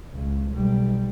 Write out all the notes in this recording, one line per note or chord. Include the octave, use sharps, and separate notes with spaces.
C#2
B1 G3